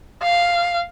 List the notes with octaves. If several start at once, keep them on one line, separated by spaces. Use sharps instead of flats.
F5